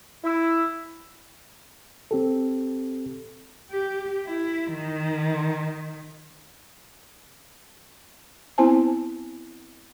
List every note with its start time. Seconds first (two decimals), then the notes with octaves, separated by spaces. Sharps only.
0.24 E4
2.11 C4 G4 A4
3.71 G4
4.26 E4
4.73 D#3
8.58 B3 C4 E4 C5 G#5 A5